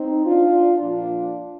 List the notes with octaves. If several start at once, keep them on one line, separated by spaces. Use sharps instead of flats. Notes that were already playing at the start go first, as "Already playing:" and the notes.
Already playing: C4 D#4
D4 F4
A#2 F3 A#3 D4 F4